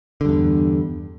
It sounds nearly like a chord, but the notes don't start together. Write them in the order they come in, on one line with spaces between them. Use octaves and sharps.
D3 G2 E2